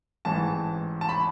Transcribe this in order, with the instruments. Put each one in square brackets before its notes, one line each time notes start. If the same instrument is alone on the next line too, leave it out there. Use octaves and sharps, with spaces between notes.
[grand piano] A1 G#2 E3 A5
A5
B5